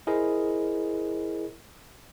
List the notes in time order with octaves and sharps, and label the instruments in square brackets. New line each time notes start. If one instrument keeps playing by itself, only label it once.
[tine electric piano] E4 G#4 A#4 C5 D#5